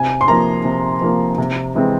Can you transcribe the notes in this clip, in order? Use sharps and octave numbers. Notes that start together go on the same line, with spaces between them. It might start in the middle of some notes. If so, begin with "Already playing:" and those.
Already playing: C3 G#5
C6
F3 A#3 A#5
C3
F3 A#3
C3
E3 G#3 C4